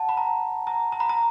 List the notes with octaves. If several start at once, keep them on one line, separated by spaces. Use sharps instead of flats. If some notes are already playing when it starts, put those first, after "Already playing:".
Already playing: F#5 A5
B5
A#5
A#5
A#5
B5
A#5